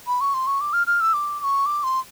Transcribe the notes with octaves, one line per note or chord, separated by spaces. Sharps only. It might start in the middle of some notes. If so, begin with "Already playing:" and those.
B5
C#6
C6
C#6
D6
F6
F6
E6
D6
D6
C#6
D6
C6